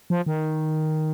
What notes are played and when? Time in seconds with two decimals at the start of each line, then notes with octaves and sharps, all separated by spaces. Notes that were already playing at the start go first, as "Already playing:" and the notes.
0.10 F3
0.26 D#3